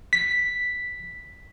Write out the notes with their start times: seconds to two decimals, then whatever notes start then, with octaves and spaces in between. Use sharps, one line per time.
0.13 B6